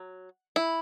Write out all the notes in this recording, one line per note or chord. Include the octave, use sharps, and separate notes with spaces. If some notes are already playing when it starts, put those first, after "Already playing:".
Already playing: F#3
E4